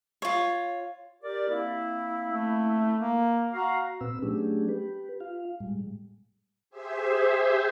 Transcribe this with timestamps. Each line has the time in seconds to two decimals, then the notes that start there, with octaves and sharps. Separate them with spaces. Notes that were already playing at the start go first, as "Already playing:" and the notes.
0.22 F4 C#5
1.23 G4 A#4 D5
1.50 A#3 C4 E4
2.30 A3
3.00 A#3
3.53 F#4 F5 A#5
4.01 A#2 C4 B4 E6
4.22 F#3 A3 C#4 D4 G4 G#4
4.69 G4 B4
5.20 F4 F5
5.60 A2 G3 G#3
6.70 G4 G#4 C5 E5